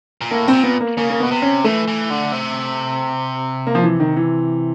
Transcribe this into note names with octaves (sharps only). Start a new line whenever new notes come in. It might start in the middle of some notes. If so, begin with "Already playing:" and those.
A#2
A2 A#3
C4
A#2
B3
A#3
C#3 A#3
A#3
B2 B3
C3
C#4
E3 A3
E3
D3
C3
A#3
F3
E3
D#3
E3